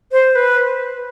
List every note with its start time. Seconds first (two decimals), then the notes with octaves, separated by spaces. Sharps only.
0.12 C5
0.35 B4